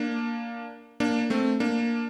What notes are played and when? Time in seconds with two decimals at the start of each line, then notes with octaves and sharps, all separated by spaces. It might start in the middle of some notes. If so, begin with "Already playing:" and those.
Already playing: A#3 D4
1.00 A#3 D4
1.30 A3 C4
1.60 A#3 D4